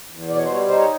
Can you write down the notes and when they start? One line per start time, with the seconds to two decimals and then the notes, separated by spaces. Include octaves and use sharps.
0.09 E2
0.28 B2 D5
0.36 C#5
0.45 C5
0.48 G3 C#5
0.68 D#4 C5
0.77 C#5